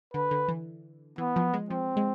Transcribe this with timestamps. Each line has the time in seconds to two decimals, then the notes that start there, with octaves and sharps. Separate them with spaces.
0.14 D3 B4
0.31 D3
0.48 E3
1.18 E3 B3
1.36 F3
1.54 G#3
1.70 F3 C4
1.97 G#3